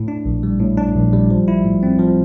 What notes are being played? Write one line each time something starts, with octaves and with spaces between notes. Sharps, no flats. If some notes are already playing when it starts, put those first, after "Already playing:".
Already playing: A2
D4
A#1
G3
A2
D4
A#1
G3
F3
E4
A2
C4
F3